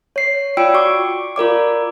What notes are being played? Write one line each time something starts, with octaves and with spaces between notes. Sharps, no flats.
C#5 C7
F4 D5 G5 E6 D7
F#4 C#6 D6
F4 A#4 D5 D6